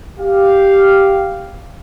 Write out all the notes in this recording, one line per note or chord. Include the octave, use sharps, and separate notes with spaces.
G4 F5